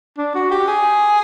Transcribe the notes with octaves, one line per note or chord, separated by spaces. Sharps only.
D4
F#4
G4
G#4